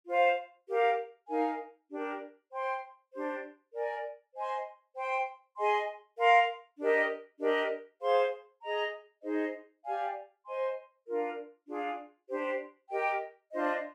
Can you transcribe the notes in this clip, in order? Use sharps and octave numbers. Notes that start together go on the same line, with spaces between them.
F4 C5 F5
G4 A#4 F5
D#4 A#4 F5 G#5
D4 G4 A#4
C5 G5 C6
D4 G4 C5
A#4 D5 G#5
C5 D#5 G#5 C6
C5 G5 C6
G#4 D#5 G#5 C6
A#4 F5 C6
D4 G4 A#4 D#5
D4 G4 A#4 D#5
G#4 C5 F5 C6
G#4 D#5 A#5
D#4 G#4 C5 D#5
G4 D5 F5 G#5
C5 D#5 G#5 C6
D4 F4 A#4
D4 F4 G#4
D4 G4 C5
G4 A#4 D#5 G5
D4 F4 C5 D#5